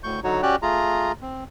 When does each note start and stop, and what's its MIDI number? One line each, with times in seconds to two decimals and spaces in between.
0.04 0.20 38
0.04 0.20 45
0.04 0.20 85
0.04 0.20 91
0.24 0.42 50
0.24 0.42 54
0.24 0.42 63
0.24 0.42 66
0.24 0.42 73
0.43 0.56 61
0.43 0.56 66
0.43 0.56 67
0.43 0.56 74
0.43 0.56 79
0.43 0.56 90
0.62 1.12 57
0.62 1.12 65
0.62 1.12 68
0.62 1.12 82
1.22 1.44 60